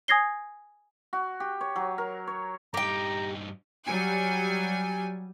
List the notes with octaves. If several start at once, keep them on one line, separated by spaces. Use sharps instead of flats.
G#5 D#6 G#6 A#6 C7 G7
F#4
G4
C#5
F#3
A#4
C#5
G2 D#4 G4 G5 A#5
F#3 G3 G#5